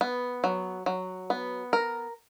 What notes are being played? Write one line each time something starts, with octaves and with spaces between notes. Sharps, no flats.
B3
F#3
F#3
B3
A#4